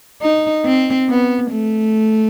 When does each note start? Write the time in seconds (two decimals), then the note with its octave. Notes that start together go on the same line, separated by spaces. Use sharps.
0.22 D#4
0.65 C4
1.09 B3
1.51 A3